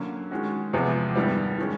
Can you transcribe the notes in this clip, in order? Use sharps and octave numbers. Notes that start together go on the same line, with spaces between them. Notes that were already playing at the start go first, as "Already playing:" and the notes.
Already playing: D3 F#3 A#3 C#4
D#3 G#3 C#4 F#4
E2 C3 F3 G#3 B3
G2 D#3 G3 B3
D#3 G#3 C#4